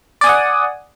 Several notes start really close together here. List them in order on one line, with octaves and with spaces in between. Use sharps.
D5 G#5 D#6 F#5